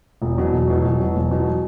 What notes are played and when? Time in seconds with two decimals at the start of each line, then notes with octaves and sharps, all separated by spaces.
0.22 E1
0.38 E2 B2 F#3
0.53 E1
0.68 E2 B2 F#3
0.84 E1
1.00 E2 B2 F#3
1.15 E1
1.30 E2 B2 F#3